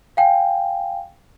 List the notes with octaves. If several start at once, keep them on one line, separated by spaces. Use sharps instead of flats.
F5 G5 G#5